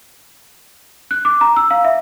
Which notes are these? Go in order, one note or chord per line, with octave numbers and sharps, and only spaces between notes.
F#6
D6
A#5
E6
F5
E5